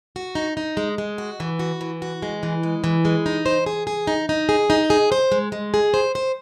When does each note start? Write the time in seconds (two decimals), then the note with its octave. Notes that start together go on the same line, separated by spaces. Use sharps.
0.16 F#4
0.35 D#4
0.57 D#4
0.77 G#3
0.98 G#3
1.18 F#4
1.40 E3
1.59 F#4
1.81 E3
2.02 F#4
2.22 G#3
2.43 E3
2.63 G#3
2.84 E3
3.05 G#3
3.26 D#4
3.46 C5
3.66 G#4
3.87 G#4
4.07 D#4
4.29 D#4
4.49 G#4
4.70 D#4
4.90 G#4
5.12 C5
5.32 G#3
5.52 G#3
5.74 G#4
5.94 C5
6.15 C5